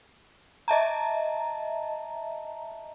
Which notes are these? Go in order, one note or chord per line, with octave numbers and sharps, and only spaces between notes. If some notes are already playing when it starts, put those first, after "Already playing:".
D#5 E5 A5 A#5